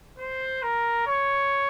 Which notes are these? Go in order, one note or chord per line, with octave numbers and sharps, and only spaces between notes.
C5
A#4
C#5